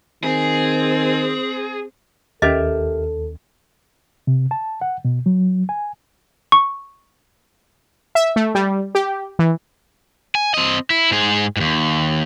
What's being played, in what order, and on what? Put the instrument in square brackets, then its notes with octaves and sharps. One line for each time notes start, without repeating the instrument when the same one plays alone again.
[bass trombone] D#3 [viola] C4 [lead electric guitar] G#4
[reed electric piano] D#2 [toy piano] C#4 D#5 [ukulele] G4 A#4 E5 [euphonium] A4
[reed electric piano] C3
A5
F#5
B2
F#3
G#5
[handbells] C#6
[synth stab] E5
A3
G3
G4
E3
[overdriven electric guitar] G#5
C4 D#5
E4
G#2 G#4
D#2 G#2